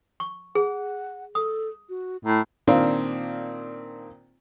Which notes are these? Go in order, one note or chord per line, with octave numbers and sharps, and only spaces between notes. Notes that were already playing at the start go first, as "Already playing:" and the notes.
C#6
G#4 F#5
A4 D#6
F#4
A2 A#5
A#2 D#3 A#3 C4 D4 F4